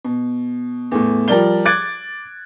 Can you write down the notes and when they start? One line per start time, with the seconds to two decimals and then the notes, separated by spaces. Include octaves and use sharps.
0.05 B2
0.91 E2 A2
1.28 F3 G3 A#4 D5 G7
1.65 D6 F#6 G#6 A6 D7